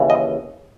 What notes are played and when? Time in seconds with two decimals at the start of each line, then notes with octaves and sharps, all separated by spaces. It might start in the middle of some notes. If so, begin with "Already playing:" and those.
Already playing: D#2 C#3 E3
0.10 D#5